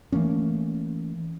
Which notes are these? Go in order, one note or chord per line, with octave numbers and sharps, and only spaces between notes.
E3 A3 A#3 C#4